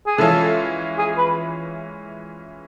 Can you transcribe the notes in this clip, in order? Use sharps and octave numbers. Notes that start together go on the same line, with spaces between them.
G#4
E3 G#3 C#4 F4 A4
G#4
B4